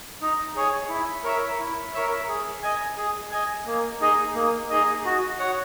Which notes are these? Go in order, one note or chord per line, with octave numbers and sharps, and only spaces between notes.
D#4
G#4 C#5 G#5
E4
A#4 C#5 E5
E4
A#4 C#5 E5
G#4
D#5 G#5
G#4
D#5 G#5
A#3
D#4 G#4 D#5
A#3
D#4 G#4 D#5
F#4
C#5 F#5